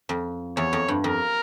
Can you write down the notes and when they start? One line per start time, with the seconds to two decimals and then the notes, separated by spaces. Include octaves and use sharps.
0.09 F2
0.57 E2 C#5
0.73 F2
0.88 G2
1.03 F2 A#4